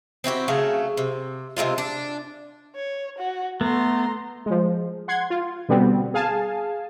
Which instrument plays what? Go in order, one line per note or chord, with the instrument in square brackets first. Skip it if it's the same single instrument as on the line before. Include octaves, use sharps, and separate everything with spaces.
[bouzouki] C4 E4 F#4 G4
C#3 F#3 A3
C3
C3 D#3 G#3 F4
D4
[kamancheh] C#5
F#4
[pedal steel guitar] A3 B3 [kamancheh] A#5 C6
[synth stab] F3 G#3
F#5 C6 G#6
F4
B2 D3 G3 B3 C4
G#4 F5 G#5 A5